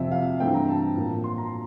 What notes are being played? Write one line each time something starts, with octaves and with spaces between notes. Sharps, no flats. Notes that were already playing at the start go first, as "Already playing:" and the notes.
Already playing: F2 C3 F3 C4 E5
F5
G2 E3 A3 C4 G5
A#5
A5
A2 F3 A#3
C6
A#5